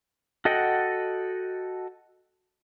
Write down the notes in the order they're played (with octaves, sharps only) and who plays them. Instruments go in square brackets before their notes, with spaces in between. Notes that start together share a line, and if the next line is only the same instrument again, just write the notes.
[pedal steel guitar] F#4 A4 D#5 F#5 G5